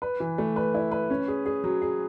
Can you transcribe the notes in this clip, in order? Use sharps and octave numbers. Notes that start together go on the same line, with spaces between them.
B4
E3
A3
B4
E4
B4
C#4
G#4
G#4
F#3
G#4